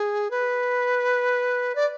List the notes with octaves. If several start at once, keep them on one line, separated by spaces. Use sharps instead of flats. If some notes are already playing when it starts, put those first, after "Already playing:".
Already playing: G#4
B4
D5